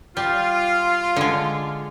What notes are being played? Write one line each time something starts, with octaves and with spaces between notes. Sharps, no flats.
G3 F4
D3 G#3